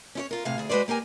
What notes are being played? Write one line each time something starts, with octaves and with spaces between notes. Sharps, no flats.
C#4 E4 C#5
F4 A#4
A2 C3 G#4 F5
D2 G#4
G#3 F#4 B4 C5 D5
A#3 G4 A#4 G#5